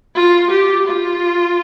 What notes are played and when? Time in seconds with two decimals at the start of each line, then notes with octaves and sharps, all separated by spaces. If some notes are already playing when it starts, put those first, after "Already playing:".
0.15 F4
0.51 G4
0.87 F4